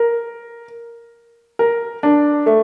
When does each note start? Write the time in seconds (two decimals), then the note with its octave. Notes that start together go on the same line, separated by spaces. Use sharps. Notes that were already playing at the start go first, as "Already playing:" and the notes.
Already playing: A#4
1.59 A#4
2.03 D4
2.46 A3